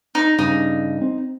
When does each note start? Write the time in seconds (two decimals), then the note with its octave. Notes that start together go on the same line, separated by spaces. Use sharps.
0.15 D#4
0.39 G2 C#3 D#4
1.01 C4